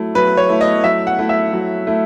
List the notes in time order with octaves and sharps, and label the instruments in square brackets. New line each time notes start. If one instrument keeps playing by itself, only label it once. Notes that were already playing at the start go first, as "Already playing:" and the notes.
Already playing: [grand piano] F#3 A3 E4
[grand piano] F#3 [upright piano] B4
[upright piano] C#5
[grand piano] A3 E4
[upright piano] D#5
[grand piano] F#3 [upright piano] E5
[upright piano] F#5
[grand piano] A3 E4
[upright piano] E5
[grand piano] F#3
A3 E4